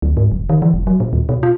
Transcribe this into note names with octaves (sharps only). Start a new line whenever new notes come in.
D2
G#2
E1
D#3
E3
F1
F#3
A#2
D#2
B2
F4